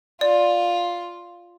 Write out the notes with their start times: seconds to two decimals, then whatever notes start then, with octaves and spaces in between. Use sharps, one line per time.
0.21 F4 D5